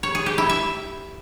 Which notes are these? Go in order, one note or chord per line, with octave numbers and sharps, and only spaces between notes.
C#5
G#4
G4
E4
E5